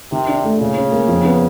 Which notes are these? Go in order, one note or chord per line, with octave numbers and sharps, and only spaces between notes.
C3 D#3
D4
A3
A#2 C#3
C#4
A#3
F2
B3